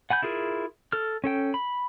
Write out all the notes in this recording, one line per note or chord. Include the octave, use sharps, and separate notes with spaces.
F#5 G#5 B5 G6
E4 F4 G#4 A#4
A4 F6
C#4 A4 G5
B5